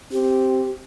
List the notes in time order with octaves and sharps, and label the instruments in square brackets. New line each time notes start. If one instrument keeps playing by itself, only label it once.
[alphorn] C4 [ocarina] G4